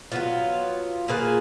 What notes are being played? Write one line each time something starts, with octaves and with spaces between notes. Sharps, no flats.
F#3 B3 F4
A#3 F4 G#4 B4